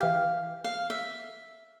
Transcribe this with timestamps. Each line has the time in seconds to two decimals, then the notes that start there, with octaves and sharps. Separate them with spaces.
0.01 E3 G4 F5
0.64 F5
0.90 E5